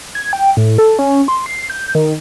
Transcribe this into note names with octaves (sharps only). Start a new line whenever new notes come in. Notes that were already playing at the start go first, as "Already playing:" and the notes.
G#6
G5
A2
A4
C#4
C6
C7
G6
D#3